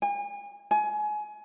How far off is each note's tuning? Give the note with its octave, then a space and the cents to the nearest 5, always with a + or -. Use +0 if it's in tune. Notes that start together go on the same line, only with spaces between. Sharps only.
G#5 -40
G#5 +25